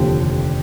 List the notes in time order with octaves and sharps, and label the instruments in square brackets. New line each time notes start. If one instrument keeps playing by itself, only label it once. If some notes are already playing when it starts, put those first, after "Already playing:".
Already playing: [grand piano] F1 D#2 D3 F3 G4